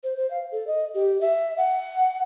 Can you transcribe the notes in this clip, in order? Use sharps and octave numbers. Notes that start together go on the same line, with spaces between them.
C5
C5
F5
A4
D#5
G4
E5
F#5